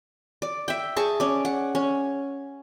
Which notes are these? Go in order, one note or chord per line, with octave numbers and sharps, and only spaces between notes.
D5
E5 G5
G#4 A5 C#6
C#4 D5
F#5
C#4